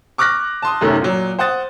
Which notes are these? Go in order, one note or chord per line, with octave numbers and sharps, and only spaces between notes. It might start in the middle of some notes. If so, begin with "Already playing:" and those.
C#6 D6 F6 F#6 A#6
A5 C6 D#6
F#2 C3 D#3 F#3 A3 C#4
A#2 F#3
C5 F#5 D#6 A6